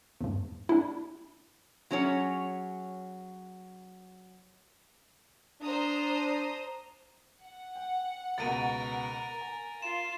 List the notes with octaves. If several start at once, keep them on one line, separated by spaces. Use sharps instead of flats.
E2 G2
D4 E4
F#3 C#4 G#4 C#5
D4 C5 A#5 D#6
F#5
G5
C#2 B2 A#4 A6 D7 D#7
G#5
F4 E7